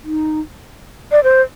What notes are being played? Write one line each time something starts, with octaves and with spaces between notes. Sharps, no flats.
D#4
D5
C5